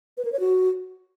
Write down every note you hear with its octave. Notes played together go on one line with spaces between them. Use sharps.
B4
A#4
C#5
F#4